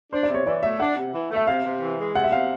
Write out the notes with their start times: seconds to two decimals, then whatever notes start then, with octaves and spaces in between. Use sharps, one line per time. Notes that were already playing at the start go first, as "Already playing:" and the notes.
0.13 D4 C5
0.23 D5
0.29 C3
0.35 C#5
0.46 E3 D5
0.63 A3 E5
0.79 D4 F#5
0.97 C3
1.14 E3
1.31 A3
1.36 E5
1.47 C3 F5
1.64 C3
1.82 E3
1.98 G#3
2.15 C3 F#5
2.23 E5
2.32 C3 F5